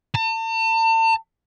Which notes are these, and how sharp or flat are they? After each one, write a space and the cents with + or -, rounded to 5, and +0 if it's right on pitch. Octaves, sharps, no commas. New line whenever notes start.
A5 +40